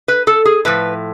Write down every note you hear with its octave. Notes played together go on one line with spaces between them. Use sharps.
B4
A4
G#4
A2 F3 B4